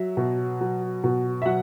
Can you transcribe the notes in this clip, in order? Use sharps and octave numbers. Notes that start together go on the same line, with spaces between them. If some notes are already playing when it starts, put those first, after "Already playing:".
Already playing: F#3 E5
B2
F#3
B2
E5
F#3 F#5